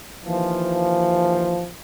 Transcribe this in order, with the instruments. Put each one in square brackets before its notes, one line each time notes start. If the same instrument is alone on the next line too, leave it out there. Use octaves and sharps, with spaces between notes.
[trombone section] D#2 E3 F3